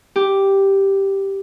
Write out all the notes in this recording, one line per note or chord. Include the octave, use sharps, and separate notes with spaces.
G4